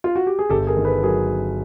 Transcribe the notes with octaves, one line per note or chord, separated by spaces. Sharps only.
F4
F#4
G4
G#4
G1 G4 A4
G#4 A#4
D#3
A4 B4
F#3 G#4 A#4